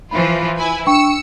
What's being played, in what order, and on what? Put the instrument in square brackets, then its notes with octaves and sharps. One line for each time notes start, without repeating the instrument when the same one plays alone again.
[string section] E3 F3 F4 [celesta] B5
[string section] E4 B4 G#5
[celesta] D4 G5 C#6 [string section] E6 C#7